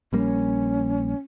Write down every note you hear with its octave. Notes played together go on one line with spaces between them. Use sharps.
A#1 G3 A#3 C#4